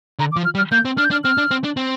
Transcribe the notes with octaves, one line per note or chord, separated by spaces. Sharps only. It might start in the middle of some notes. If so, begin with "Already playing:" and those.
D3 A#5
D6
F3
F6
G3
F6
A#3 G6
C4
D4 F6
G6
D4 F6
C4 F6
D4
C4
D4
C4